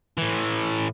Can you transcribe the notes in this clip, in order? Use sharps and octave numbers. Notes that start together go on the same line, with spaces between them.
A2 E3